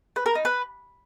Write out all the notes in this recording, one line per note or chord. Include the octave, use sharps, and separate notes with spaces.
B4
A#4
D#4
B4